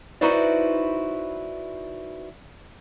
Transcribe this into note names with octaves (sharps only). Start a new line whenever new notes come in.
D#4 E4 F#4 B4 C5 D5